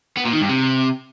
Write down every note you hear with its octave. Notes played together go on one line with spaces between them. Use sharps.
B3
A#2
D#3
G2
C3